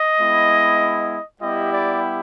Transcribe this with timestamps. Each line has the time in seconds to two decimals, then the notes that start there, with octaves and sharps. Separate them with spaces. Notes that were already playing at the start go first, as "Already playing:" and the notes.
Already playing: D#5
0.19 G#3 B3 E4
1.42 G3 B3 E4 G4 D#5
1.72 D5